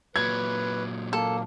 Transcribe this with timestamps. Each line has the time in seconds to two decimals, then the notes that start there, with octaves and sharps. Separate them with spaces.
0.16 A#2 F#3 B4 G#6
1.13 A#3 A4